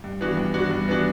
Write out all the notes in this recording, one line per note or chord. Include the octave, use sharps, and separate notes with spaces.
G2
E3 B3 D4 F#4
G2
E3 B3 D4 F#4
G2
E3 B3 D4 F#4